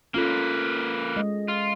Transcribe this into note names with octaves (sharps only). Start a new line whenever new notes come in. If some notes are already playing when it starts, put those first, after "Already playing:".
A#3 C#4 F4 A4 B4
G#3 D#5
F4